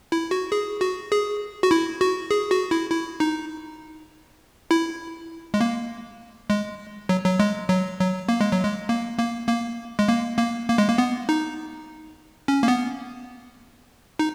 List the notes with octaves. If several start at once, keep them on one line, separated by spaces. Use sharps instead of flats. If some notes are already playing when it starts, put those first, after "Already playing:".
E4
F#4
G#4
F#4
G#4
F#4
E4
F#4
G#4
F#4
E4
E4
D#4
E4
G#3
A#3
G#3
F#3
F#3
G#3
F#3
F#3
A#3
G#3
F#3
G#3
A#3
A#3
A#3
G#3
A#3
A#3
A#3
G#3
A#3
B3
D#4
C#4
A#3
B3
D#4